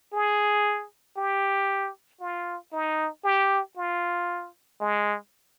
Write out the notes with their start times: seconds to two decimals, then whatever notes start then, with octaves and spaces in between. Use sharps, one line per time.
0.13 G#4
1.17 G4
2.21 F4
2.73 D#4
3.24 G4
3.76 F4
4.80 G#3